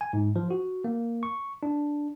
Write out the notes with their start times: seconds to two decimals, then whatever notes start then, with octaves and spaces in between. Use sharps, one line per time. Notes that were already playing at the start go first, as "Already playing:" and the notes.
0.01 G#5
0.13 G#2
0.36 F3
0.51 F#4
0.84 A#3
1.23 C#6
1.63 D4